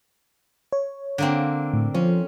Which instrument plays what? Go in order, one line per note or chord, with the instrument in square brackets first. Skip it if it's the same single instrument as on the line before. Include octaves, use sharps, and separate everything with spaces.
[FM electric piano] C#5
[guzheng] D3 A#3 C4
[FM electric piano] A2
[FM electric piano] F3 F4 C5 [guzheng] C#4